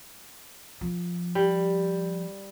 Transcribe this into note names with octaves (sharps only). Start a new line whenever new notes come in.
F3
G3